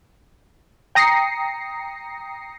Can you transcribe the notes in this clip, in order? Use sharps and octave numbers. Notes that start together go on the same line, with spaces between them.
G5 A#5 D#6 A#6 C7 C#7